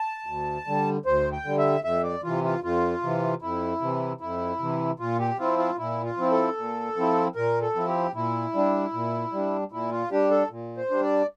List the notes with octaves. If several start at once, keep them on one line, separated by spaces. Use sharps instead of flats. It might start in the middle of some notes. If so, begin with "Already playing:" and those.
Already playing: A5
D2
D3 G3
D2 C5
G5
D3 G3
E5
F2 E5
D5
C3 E3 F4
F4
F2 F4
C3 E3
F2 E4
C3 E3
F2 E4
C3 E3
A#2 F4
G4
F3 C4 E4 F4
F4
A#2 E4
F4
F3 C4 E4
A4
A#2
F3 C4 E4
A#2 A#4
A4
F3 C4 E4
G4
A#2 E4
G3 D4
A#2
G3 D4
A#2 E4
F4
G3 D4 G4
A4
A#2
C5
G3 D4
D5